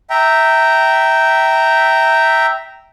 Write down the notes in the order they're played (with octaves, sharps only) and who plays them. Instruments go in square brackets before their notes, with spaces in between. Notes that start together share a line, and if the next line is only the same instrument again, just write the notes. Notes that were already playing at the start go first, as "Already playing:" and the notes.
[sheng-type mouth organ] E5 G5 A#5